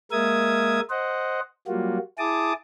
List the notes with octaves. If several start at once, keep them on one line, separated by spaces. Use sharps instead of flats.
G#3 A#3 A#4 E5 D#6 G#6
C5 D#5 F#5
F#3 G3 A#3 F4 F#4
E4 G#4 A5 D6 D#6